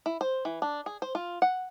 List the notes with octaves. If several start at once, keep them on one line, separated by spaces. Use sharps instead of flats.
E4
C5
E3
D4
G#4
C5
F4
F#5